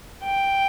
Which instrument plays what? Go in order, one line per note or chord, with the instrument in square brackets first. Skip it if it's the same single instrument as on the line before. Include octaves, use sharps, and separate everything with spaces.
[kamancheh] G5